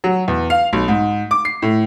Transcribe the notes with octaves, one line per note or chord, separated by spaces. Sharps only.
F#3
E2
F5
B1
G#2
D6
C7
A2